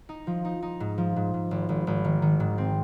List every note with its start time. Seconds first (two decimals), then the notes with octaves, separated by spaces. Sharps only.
0.09 D#4
0.27 F3
0.45 D#4
0.62 D#4
0.80 G#2
0.98 F3
1.16 G#2
1.34 G#2
1.51 G#1
1.69 G#1
1.87 G#1
2.04 D#3
2.22 D#3
2.40 G#2
2.58 C4